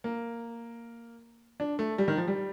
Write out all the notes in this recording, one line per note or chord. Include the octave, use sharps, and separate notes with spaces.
A#3
D4
A3
G3
D#3
F3
G3